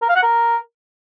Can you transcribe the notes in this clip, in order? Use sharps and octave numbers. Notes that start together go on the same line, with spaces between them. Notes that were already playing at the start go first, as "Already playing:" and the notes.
A#4
F5
F#5
A#4